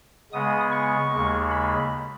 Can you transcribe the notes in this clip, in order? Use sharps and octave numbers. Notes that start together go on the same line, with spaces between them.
C#3 G#3 B3 D#6
C#6
D#2 C#3 G#3
B5